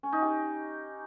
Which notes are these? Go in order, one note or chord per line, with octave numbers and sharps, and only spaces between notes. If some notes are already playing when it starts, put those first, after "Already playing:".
C#4
D#4
G4